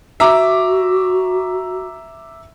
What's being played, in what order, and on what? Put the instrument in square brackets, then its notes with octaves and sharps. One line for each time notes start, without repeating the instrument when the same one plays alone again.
[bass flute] F#4 [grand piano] E5 A#5 D6